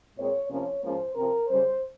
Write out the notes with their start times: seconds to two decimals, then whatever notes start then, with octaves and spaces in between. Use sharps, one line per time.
0.16 A#2 G#3 C4 C#5
0.49 C3 F3 A#3 C#4 C#5
0.82 G#2 F3 A#3 C#4 C5
1.15 C3 F3 C4 A#4
1.48 C#3 G3 C#4 C5